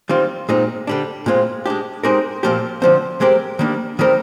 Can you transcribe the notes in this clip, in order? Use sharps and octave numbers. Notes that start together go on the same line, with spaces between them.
D#3 G3 C4 F4
A#2 G#3 C4 D#4
D3 G3 D4
A#2 G#3 C4 F4
G#3 D4 G4
G#3 C4 D#4 G4 A#4
A#2 F3 C4 G4 A#4
D3 F3 C4
G#3 C4 G4 A#4
D#3 G3 A#3 D4
D#3 G3 C4 G4 A#4